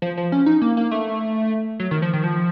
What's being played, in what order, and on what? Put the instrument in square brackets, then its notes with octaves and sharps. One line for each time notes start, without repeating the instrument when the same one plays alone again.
[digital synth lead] F3
F3
C#4
D#4
A#3
A#3
A3
F#3
D#3
F3
D#3
F3